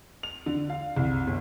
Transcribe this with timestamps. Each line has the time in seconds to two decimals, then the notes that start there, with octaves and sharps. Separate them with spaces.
0.23 F7
0.46 D3
0.70 F5
0.97 C2
1.27 G1